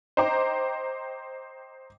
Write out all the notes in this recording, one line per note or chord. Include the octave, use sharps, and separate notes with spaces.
C5 D#5 G5 A#5 D6